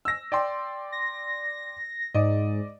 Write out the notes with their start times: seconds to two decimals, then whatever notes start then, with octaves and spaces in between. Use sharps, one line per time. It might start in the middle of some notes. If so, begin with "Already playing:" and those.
0.05 E6 A#6
0.32 D5 G5 C6
0.92 A#6
2.14 G#2 D5 D#5